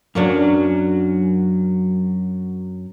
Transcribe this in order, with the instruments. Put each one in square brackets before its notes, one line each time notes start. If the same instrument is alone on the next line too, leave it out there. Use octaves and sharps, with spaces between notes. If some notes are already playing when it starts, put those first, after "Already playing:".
[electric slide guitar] F#2 F#3 [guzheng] A#3 C#4 D4